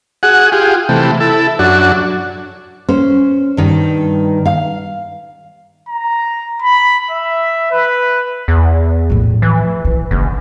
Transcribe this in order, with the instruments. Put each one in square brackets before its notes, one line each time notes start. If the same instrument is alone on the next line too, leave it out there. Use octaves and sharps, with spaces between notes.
[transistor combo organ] F#4 G#4 F#5
F4 G4 G#4
C3 E3 A3
E4 A4
F#2 D4 F#4
[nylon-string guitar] C#4 C5
G2 D#3
F5
[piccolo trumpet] A#5
B5
E5
B4
[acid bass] E2
[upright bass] A2 F3
[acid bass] E3
[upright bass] D#3
[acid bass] F#1 [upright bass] D3